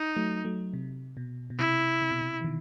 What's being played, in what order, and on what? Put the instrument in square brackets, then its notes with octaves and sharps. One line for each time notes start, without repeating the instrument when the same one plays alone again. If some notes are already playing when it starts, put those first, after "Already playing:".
Already playing: [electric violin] D#4
[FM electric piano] F#3 A3
F#3 A3
C3
B2
B2
[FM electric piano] C3 [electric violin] E4
[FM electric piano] C3
B2
C3
E3
B2 D#3